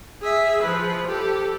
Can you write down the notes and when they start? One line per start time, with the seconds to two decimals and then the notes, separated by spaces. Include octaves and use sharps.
0.22 G#4 E5
0.62 F3 B4
1.07 G4 A4